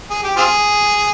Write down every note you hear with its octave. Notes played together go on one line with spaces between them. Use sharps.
G#4
G4
C4 F4 G#4